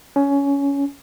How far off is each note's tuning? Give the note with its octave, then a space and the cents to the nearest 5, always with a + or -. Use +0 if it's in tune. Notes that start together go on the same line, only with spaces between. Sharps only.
C#4 +15